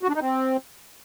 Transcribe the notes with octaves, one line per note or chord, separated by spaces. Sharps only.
F#4
D4
D#4
C4